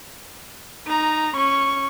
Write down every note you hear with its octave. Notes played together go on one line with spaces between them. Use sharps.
D#4 A#5
C#4 C#6